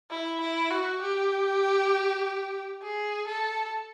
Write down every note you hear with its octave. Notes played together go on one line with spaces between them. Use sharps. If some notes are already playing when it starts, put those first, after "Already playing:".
E4
E4
F#4
G4
G#4
A4